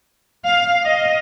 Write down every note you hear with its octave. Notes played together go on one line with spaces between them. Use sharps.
F5
D#5